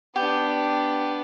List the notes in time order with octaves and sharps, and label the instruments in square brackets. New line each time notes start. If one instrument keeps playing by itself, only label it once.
[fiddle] B3 D4 [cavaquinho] G4